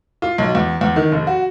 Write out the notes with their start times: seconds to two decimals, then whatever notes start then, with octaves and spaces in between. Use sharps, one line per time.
0.22 F4
0.38 B1
0.55 E2
0.81 E2
0.96 D#3
1.12 F1
1.27 F#4